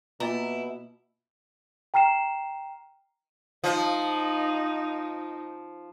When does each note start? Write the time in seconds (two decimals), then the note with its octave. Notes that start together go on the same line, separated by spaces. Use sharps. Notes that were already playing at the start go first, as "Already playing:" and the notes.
0.20 B2 A#3 E4 F4 A#5
1.94 G5 A#5 F6 C7 E7
3.64 F3 D#4